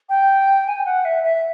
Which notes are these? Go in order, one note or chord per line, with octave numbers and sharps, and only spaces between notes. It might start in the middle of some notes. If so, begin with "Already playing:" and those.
G5
G#5
G5
F#5
E5
E5